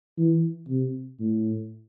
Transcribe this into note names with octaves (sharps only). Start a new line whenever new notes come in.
E3
C3
A2